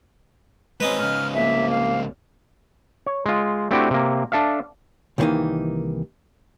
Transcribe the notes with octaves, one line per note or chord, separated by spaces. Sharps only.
G#3 C4 C#4 D#4 B4
G#2 C#3 F6
C2 A#3 E5
F5
C#5
G#3 F4
A3 C4 D4 E4 F#4 G4
C3 A#3
D4 A4 E5 F5
C2 D#3 E3 G3 A#3 D#4